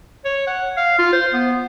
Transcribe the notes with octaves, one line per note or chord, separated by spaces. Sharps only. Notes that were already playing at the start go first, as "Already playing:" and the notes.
C#5
F#5
F5
F4
C5
B3